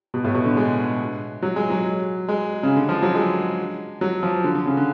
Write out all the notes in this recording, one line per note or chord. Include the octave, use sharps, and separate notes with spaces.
B2
A2
B2
D3
G#3
F#3
G#3
F#3
G#3
C#3
D3
F3
F#3
G#3
F#3
F3
D3
D3
C#3
D3